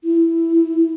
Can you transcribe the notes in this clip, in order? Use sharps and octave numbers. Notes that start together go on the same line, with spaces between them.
E4